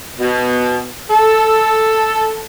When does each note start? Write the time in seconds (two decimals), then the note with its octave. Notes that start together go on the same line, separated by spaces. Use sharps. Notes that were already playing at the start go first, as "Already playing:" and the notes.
0.19 B2
1.10 A4